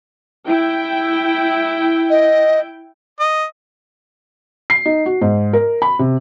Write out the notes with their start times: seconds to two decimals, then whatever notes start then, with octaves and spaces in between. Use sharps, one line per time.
0.47 E4 G5
2.10 D#5
3.20 D#5
4.70 C7
4.86 D#4
5.06 F#4
5.21 G#2
5.53 A#4
5.82 B5
5.99 C3